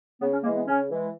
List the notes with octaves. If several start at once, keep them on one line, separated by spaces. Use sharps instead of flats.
C#3 B3
C#4
E3 G#3 A#3
B3
C#3 C#4
E3 G#3